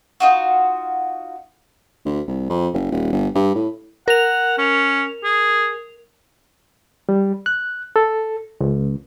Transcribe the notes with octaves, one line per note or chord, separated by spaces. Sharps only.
D#4 F4 F#4
D2
C2
F2
F#1
D#1
G1
G2
A2
A#4 F#5 F7
C#4
G#4
G3
F#6
A4
C#2